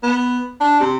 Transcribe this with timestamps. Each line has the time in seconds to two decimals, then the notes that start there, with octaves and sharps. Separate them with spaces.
0.03 B3
0.61 D4
0.81 C3